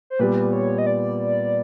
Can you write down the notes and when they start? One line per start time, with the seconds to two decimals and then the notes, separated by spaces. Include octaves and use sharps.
0.10 C5
0.19 A#2 G3 B3 B4
0.53 C#5
0.78 D#5
0.86 D5